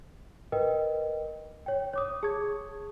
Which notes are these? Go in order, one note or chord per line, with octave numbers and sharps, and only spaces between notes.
A#4 B4 D#5 G5
C#5 G5
C#5 D6 D#6
G#4 A5 C#6 D#6 G#6